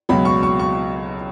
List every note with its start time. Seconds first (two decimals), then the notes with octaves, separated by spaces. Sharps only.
0.09 C#2 B2 F#3 B5
0.25 C#6
0.43 C#6
0.59 C#6